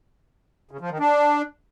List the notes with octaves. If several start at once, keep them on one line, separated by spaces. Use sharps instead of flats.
C#3
F3
D#3
D4